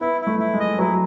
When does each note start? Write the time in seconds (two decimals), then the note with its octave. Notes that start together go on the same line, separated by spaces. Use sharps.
0.01 B3 E4
0.21 E4
0.27 A3
0.40 E4
0.54 G#3
0.60 D#5
0.79 F#3 E4